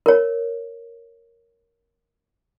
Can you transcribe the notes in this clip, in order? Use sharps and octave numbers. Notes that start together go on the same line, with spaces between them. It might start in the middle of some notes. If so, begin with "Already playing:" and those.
A#4 C#5